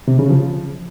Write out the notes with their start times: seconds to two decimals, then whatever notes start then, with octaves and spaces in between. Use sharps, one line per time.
0.08 C3
0.19 C#3
0.30 F3